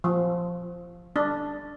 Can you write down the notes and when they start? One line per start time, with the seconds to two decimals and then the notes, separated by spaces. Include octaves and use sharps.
0.04 F3
1.16 D4